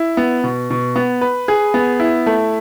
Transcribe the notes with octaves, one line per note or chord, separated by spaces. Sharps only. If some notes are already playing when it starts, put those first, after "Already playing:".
Already playing: E4
B3
B2
B2
B3
B4
G#4
B3
E4
A3